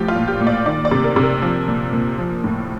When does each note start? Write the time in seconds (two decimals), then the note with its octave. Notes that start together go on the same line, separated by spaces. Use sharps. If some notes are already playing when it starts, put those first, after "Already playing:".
Already playing: A2 F3 G4
0.08 F4
0.15 A#2
0.28 G4
0.41 A#2
0.47 D5
0.66 D#3 D5
0.85 D5
0.91 C3
1.04 A#4
1.16 C3
1.23 A#4
1.42 F3
1.68 A#2
1.93 A#2
2.18 F3
2.44 A2